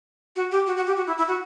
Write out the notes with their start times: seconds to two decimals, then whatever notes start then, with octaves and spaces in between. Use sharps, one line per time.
0.36 F#4
0.51 G4
0.67 F#4
0.77 F#4
0.87 G4
0.97 F#4
1.07 E4
1.18 E4
1.28 F#4